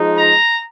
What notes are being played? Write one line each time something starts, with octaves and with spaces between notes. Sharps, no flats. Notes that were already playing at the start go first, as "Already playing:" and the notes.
Already playing: F3 G#3 D#4
A#5